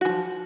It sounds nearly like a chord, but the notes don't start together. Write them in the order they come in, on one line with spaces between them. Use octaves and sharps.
F#4 E3 F3